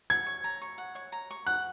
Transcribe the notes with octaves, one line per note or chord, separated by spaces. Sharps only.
F#5 G#6
C#5
A#5
C#6
F#5
C#5
A#5
C#6
F#5 F#6